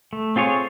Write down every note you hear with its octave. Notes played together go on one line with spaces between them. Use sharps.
A3
C4 F4 G#4 C#5